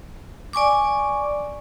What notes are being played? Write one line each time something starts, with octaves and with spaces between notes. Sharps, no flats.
D5 G#5 C#6 D6